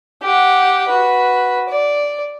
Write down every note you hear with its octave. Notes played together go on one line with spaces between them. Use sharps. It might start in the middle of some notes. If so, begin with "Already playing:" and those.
G4 F#5
F#4 B4
D5